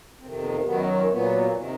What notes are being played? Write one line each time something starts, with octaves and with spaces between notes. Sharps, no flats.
F2 C3 D#3 C4
B3
F#2 D#3 F#3 B3
A#2 F#3 B3
C3 D#3